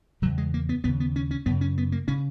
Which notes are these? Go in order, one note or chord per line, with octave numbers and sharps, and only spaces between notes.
E2 C#3 F#3
G#3
A#3
B3
D#2 C#3 B3
B3
C#4
C#4
F#2 C#3 B3
C#4
B3
A#3
C#3 C#4